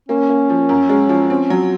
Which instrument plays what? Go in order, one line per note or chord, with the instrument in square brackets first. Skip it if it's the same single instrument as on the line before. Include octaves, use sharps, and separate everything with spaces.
[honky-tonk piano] A#3 [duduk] C#4
[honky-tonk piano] A#3
F3
F#2
G#3
F3
C4
F#3